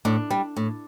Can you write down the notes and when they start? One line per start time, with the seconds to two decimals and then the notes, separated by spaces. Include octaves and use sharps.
0.05 A2 D4
0.30 G3
0.57 A2